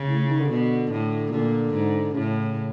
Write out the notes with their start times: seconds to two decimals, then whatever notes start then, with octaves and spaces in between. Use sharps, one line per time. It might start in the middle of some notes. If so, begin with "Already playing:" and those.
Already playing: C#3
0.08 A2
0.29 D#3
0.40 D3
0.49 B2
0.92 A2
1.32 A#2 D3
1.74 G#2
2.14 A2 C#3